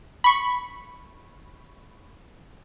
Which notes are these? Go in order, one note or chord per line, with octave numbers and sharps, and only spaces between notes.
B5 C#6